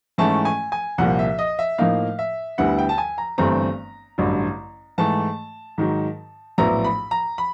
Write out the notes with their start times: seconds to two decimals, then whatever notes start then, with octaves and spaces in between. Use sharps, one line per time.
0.18 G#2 E3 A3 C#4 E4 A5
0.45 G#5
0.72 G#5
0.98 C2 A#2 F3 A#3 F#5
1.19 E5
1.39 D#5
1.59 E5
1.78 A2 F3 A#3 D#4 F5
2.19 E5
2.58 D2 D3 G3 B3 E4 F#5
2.78 G5
2.89 A5
2.98 G#5
3.18 A#5
3.38 G1 G2 E3 A3 C4 A#5
4.18 A1 G2 D3 F#3
4.98 G#2 E3 A3 A5
5.78 G#2 D#3 F#3
6.58 A#1 A2 F#3 B3 E4 A#5
6.84 B5
7.11 A#5
7.38 B5